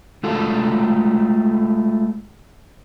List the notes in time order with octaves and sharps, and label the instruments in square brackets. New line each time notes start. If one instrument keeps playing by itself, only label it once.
[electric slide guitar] G#3 A3 F4 F#4 A4